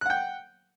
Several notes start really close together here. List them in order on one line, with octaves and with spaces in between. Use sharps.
F#6 F#5 G5